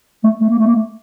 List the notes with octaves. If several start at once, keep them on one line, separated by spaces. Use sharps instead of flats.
A3
A3
A#3
A3
A#3
A3